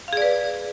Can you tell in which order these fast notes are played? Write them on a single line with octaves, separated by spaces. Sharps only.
F5 G#4 D5 B4